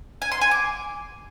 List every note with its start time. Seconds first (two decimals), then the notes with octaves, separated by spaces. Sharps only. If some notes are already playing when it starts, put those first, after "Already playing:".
0.22 G#5
0.32 C6
0.41 G#5
0.51 D6